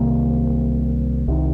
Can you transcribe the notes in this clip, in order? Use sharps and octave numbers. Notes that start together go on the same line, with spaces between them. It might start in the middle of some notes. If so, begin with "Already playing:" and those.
Already playing: C2 C3 D#3 A#3
C2 C3 D#3